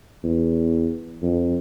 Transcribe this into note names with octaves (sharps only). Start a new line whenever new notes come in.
E2
F2